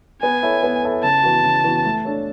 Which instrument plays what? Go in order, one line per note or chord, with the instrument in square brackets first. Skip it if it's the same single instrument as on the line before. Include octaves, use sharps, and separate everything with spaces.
[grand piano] B3 [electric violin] G#5
[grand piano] E4 A4 C#5
B3
E4 A4 C#5
[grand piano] C#3 [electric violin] A5
[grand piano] E3 B3 F#4
C#3
E3 B3 F#4
A3
D4 A4 C#5